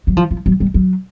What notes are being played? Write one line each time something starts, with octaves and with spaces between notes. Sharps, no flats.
F#3
F3
F3
F#3
G3
F#3